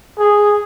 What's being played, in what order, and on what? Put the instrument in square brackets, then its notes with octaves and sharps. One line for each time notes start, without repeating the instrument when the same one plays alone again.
[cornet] G#4